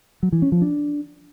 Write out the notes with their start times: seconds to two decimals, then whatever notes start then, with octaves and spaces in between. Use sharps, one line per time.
0.23 F#3
0.32 E3
0.42 C#4
0.52 F3
0.62 D4